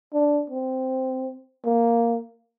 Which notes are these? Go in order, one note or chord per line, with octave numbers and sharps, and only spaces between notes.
D4
C4
A#3